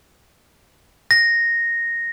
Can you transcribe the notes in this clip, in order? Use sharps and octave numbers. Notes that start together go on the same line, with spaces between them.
A#6